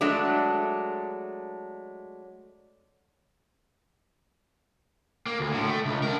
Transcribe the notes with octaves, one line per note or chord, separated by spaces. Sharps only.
F#3 G#3 A3 D4
A#3
D2
A2 D3
A3
C#2
D4 A#4